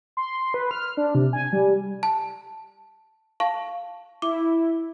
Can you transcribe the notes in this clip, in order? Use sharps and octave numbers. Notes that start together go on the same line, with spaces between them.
C6
B4
F6
D4
C3
G#5
G3
A5
F5 A5 C#6
E4 D6